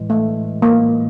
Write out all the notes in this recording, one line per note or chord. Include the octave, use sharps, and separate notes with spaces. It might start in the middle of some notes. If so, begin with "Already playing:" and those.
Already playing: A2 E3 G#3
A3
A#3